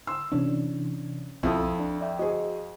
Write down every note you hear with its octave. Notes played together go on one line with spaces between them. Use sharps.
C6 E6
C3 E3 C#4 D4
B1 F2 E4 A4 D#6
D4
D5 E5 G5
F#4 G#4 C5 D#5